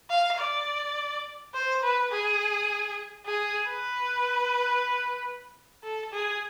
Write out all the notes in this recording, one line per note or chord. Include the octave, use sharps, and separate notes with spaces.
F5
D5
C5
B4
G#4
G#4
B4
A4
G#4